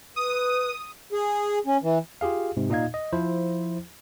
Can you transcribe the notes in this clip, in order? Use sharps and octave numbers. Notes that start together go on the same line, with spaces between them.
B4 D#6
G#4
C#4
E3
F4 G4 G#4 F5
G#2 C3
A#2 D#4 D#5 F5 G#6
D#5
F3 E4 C5